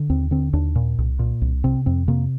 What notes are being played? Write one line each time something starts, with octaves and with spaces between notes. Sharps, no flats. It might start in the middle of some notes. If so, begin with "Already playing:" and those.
Already playing: D3
D#2 C4
D3 C4
D#2 D4
A#2
C2
A#2
C2
C3 C4
F2 C4
C3 A#3